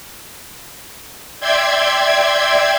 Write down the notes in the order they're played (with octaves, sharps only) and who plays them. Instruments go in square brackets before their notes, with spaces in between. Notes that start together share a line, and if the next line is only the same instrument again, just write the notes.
[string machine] D5 E5 G5 C6 G#6